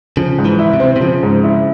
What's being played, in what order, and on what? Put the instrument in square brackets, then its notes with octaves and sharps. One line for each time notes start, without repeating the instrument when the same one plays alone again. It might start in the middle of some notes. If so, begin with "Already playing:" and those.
[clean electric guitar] C#3 [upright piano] F3
[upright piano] G#2
[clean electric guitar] E3
[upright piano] E4
[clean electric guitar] C3
[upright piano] C4
[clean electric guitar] C3
[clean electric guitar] C#3 [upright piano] F3
[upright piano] G#2
E4